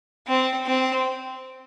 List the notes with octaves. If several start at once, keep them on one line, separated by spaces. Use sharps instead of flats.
C4
C4